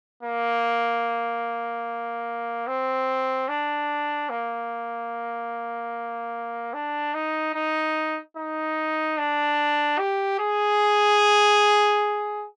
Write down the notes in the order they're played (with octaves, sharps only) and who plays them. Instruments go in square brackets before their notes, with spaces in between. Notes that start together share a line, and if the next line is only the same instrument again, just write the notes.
[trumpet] A#3
C4
D4
A#3
D4
D#4
D#4
D#4
D4
G4
G#4